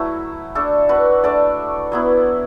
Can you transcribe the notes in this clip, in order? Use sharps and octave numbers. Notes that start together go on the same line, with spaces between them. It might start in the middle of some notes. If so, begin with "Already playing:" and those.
Already playing: F#3 A3 E4 F#4 B4
A3 D4 A4
F#4 B4
A3 D4 A4 D5
F#3 B3 E4